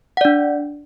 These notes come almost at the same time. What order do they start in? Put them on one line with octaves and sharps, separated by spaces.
F#5 D5 D4